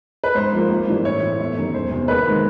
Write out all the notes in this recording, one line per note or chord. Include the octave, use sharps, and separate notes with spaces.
B4
G#2 C5
F3 A#3
G#1
G2 E3 G3
A2 C#5
E3 A3 C4
G1
F#2 D#3 G3
E1 C5
E2 C3
D#2 B4
D#3 G#3 C4